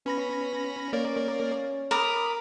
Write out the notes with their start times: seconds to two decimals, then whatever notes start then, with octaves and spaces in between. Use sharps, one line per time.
0.06 B3 C#4 B5 A#6
0.93 A#3 C#4 A#4 D5
1.91 A#4 B5 D6 D#6